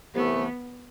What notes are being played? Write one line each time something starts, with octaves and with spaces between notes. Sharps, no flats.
C2 C3 E3 A3 B3